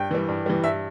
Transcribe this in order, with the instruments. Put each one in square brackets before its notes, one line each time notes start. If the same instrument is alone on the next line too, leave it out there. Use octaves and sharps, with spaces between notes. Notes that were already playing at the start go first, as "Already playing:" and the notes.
Already playing: [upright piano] G2 G5
E3 G3
G2
E3 G3
G2 E5